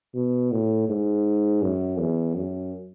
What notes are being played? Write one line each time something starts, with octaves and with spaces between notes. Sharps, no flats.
B2
A2
G#2
F#2
E2
F#2